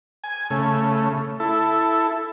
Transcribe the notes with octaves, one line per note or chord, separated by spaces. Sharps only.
G#5
C#3 A3
E4 A4